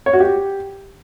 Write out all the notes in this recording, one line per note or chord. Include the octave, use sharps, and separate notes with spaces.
C#5
F#4
G4